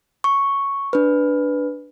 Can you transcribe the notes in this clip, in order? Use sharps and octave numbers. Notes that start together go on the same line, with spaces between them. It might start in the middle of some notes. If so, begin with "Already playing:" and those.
C#6
D4 B4